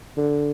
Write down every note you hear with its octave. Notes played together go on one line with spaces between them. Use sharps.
D3